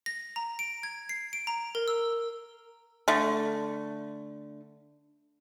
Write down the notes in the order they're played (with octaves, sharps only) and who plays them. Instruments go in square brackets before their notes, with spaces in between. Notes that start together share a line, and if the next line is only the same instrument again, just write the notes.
[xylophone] A#6
A#5
D7
G#6
C7
D7
A#5
A#4
E6
[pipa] D3 A3